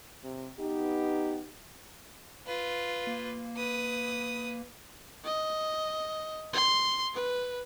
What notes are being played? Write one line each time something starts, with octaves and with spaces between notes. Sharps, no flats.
C3
B3 D#4 G4
F4 B4
A#3
B4 D#6
D#5
C6
B4